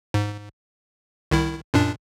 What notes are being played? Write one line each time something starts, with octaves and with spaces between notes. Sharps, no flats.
G#2
C2 D#3 E4
F#2 A#2 D4